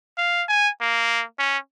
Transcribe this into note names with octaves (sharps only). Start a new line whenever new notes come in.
F5
G#5
A#3
C#4